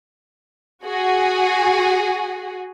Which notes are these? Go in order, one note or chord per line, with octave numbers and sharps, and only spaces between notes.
F#4 G#4